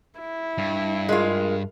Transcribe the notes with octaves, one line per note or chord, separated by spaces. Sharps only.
E4
G2
G#3 F4 A#4